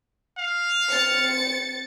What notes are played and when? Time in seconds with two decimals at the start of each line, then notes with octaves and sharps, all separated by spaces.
0.38 F5
0.90 C4 A6 C#7